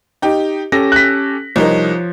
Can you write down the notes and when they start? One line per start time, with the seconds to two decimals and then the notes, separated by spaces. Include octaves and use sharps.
0.22 D#4 G4
0.72 C#4 G4 A4 A#6
0.92 F#6 B6
1.56 C2 F3 D#4 A#4 C#5